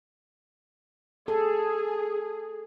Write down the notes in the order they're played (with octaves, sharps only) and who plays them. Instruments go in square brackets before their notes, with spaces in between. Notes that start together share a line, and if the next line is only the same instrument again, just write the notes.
[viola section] G#4 [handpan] A4